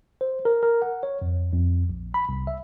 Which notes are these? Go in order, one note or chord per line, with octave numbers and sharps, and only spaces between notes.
C5
A#4
A#4
F#5
C#5
F2
F2
A#1
B5
C2
E5